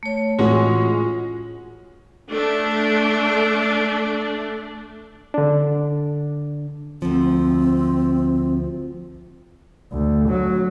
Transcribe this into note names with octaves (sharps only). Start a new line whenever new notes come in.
A3 C#5
A2 E3 G#3 C#4 F4 F#4 C#5
A3 D4
D3 D4
D2 F3 C4
D2
F#3